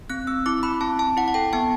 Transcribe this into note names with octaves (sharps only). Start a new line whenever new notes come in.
C4 F#6
C4 E6
E4 D6
E4 B5
C4 A5
C4 A5
E4 F#5
F#5
A4 G5
B3 A5